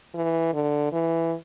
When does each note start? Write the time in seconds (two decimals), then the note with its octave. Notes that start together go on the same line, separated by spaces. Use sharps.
0.14 E3
0.53 D3
0.92 E3